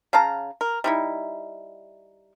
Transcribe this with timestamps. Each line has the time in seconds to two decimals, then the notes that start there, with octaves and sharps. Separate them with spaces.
0.13 C#3 F5 A5 A#5
0.61 A#4
0.84 G3 D#4 E4